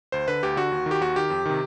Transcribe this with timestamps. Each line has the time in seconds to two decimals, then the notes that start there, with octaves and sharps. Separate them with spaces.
0.12 D2 C5
0.28 D3 B4
0.43 D2 G4
0.57 D3 F#4
0.72 D#2
0.86 D#3
0.91 G4
1.01 D#2 F#4
1.16 D#3 G4
1.30 F2
1.46 C3 D#3